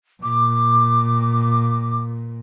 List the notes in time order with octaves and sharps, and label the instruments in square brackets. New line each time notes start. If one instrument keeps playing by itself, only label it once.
[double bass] A#2 [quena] D6